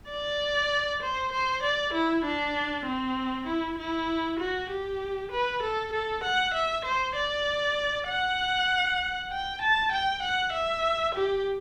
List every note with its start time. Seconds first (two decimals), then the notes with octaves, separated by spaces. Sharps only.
0.10 D5
1.02 C5
1.32 C5
1.63 D5
1.93 E4
2.25 D4
2.86 C4
3.47 E4
3.78 E4
4.39 F#4
4.70 G4
5.32 B4
5.62 A4
5.93 A4
6.23 F#5
6.54 E5
6.85 C5
7.15 D5
8.07 F#5
9.31 G5
9.61 A5
9.92 G5
10.22 F#5
10.53 E5
11.15 G4